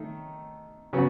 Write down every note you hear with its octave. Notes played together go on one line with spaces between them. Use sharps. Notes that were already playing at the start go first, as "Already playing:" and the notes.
Already playing: D#3 A3
C#3 F#3 B3